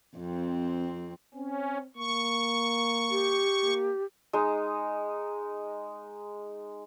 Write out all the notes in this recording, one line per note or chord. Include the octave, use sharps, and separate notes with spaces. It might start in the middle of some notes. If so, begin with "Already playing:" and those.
F2 C4
C4 C#4
A#3 C#6
G4
A#3
G#3 D#4